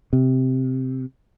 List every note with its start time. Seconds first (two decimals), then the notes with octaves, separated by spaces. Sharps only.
0.13 C3